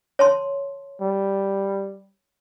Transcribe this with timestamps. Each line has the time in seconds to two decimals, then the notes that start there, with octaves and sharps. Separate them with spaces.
0.19 C#5 A5 C6
1.01 G3